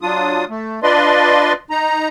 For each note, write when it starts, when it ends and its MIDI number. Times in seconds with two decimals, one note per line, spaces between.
0.02 0.45 54
0.02 0.45 62
0.02 0.45 65
0.02 0.45 87
0.49 0.80 57
0.83 1.53 62
0.83 1.53 65
0.83 1.53 71
0.83 1.53 74
0.83 1.53 75
0.83 1.53 84
1.70 2.09 63
1.70 2.09 82